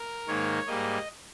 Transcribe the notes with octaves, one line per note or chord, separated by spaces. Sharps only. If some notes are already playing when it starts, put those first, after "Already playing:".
Already playing: A#4
G#2 D#3 A#3 C#5
G#2 G3 A#3 D#5